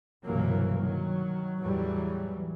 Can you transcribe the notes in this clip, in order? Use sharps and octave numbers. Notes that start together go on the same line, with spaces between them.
G1 C2 B2 E3 F#3 A#3
D#3 F#3
E2 A2 E3 F#3 G3